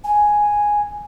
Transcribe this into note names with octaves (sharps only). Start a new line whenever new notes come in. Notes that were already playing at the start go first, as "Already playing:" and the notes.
G#5